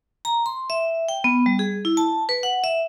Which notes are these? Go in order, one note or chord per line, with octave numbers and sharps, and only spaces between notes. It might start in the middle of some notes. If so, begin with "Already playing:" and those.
A#5
C6
E5
G5
B3
G3
G#4
E4
A5
B4
F#5
E5